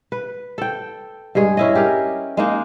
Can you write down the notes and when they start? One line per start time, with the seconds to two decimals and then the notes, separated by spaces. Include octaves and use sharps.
0.12 B4
0.58 A4 G5
1.35 G2 G#3 G#4
1.57 C#4 E4 D#5
1.75 G4 G#4 A#4
2.37 G#3 A#3 D#4